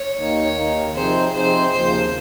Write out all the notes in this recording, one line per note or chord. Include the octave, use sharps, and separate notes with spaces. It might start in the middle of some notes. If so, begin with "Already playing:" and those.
Already playing: C#5
D#2 D#3 A#3 D#4
D#2 D#3 A#3 D#4
C3 F3 C4 D#4 G#4 C5
C3 F3 C4 D#4 G#4 C5
D#2 C#3 F3 A#3 C5